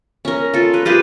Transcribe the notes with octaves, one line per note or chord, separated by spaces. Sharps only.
C#4 A#4
F4 A4
A#4 B4
F4 G4 G#4 B4